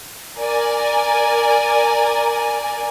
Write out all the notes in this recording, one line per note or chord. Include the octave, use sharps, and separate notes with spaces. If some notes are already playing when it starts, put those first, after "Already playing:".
A#4 D5 G#5